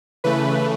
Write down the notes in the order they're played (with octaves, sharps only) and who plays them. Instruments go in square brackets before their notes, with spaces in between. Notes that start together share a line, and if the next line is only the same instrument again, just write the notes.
[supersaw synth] C#3 E3 A3 B4